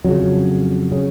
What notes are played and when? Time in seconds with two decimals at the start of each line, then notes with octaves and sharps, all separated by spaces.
0.04 F2 C#3 F#3
0.92 C#3